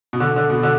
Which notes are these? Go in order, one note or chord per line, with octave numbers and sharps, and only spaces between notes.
B2
D3
D3
B2
D3